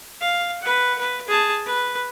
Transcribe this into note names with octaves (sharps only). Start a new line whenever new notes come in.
F5
B4 F#5
B4
G#4 A5
B4